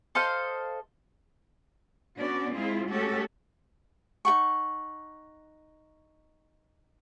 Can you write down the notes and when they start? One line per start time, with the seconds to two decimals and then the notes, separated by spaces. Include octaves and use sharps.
0.15 A4 C5 D#5 F5
2.17 B3 C#4 D4 F#4 D5
2.52 G#3 C4 E4 F4 G#4
2.87 G#3 A3 C#4 F#4 G4 A4
4.25 D#4 A#4 F#5 C#6